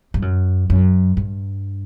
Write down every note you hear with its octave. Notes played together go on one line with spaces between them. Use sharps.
G2
F#2
F#2
G2